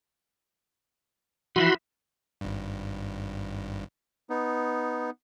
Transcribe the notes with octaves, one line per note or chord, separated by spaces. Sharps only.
E3 F3 E4 F#4 B5 C6
G#1 G2
B3 D#4